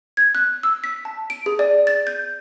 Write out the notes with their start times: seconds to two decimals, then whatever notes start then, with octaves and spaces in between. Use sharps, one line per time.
0.17 G#6
0.35 F#6
0.63 E6
0.84 B6
1.05 A5
1.30 D7
1.46 G#4
1.59 D5
1.87 A6
2.07 G6